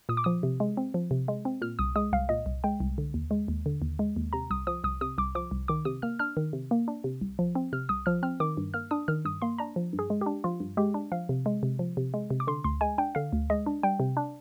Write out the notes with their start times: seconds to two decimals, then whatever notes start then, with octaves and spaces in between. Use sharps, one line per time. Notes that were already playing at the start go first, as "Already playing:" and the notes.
0.09 A#2 D#6
0.17 D6
0.24 F3 D#6
0.43 C3
0.60 G#3
0.77 C4
0.94 F3
1.11 C3
1.28 G#3
1.45 C4
1.62 A#2 F6
1.79 C2 D#6
1.96 G#3 D#6
2.13 C2 F5
2.29 A#2 D#5
2.46 C2
2.64 G#3 G5
2.80 C2
2.98 D3
3.14 D#2
3.31 G#3
3.48 D#2
3.66 D3
3.82 D#2
3.99 G#3
4.16 D#2
4.33 C3 A#5
4.50 C2 D#6
4.67 F3 D#6
4.84 C2 D#6
5.01 C3 D#6
5.18 C2 D6
5.35 F3 D6
5.51 C2
5.68 D#3 D6
5.85 C3 D#6
6.02 A#3 F6
6.19 D4 F6
6.37 D#3
6.53 C3
6.71 A#3
6.88 D4
7.04 C3
7.21 C2
7.39 F3
7.55 C4
7.73 C3 F6
7.89 C2 D#6
8.06 F3 F6
8.23 C4 F6
8.40 D#3 D6
8.57 G2
8.74 A#3 F6
8.91 D4 D#6
9.08 D#3 F6
9.25 G2 D#6
9.42 A#3 C6
9.58 D4 A#5
9.76 F3
9.93 G2
9.99 G#4
10.10 G#3
10.21 D4 G4
10.44 F3 F4
10.60 G2
10.77 G#3 G4
10.94 D4
11.12 F3 F5
11.29 C3
11.46 G#3
11.63 C3
11.79 F3
11.97 C3
12.14 G#3
12.30 C3
12.40 D6
12.47 D3 C6
12.64 D2 C6
12.81 G#3 G#5
12.98 D4 G5
13.15 D3 F5
13.33 D2
13.50 G#3 D#5
13.66 D4
13.83 G3 G5
14.00 C3
14.17 D4